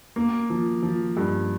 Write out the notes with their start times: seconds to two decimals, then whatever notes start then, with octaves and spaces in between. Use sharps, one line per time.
0.16 A#3
0.50 F3
0.82 F3
1.17 G2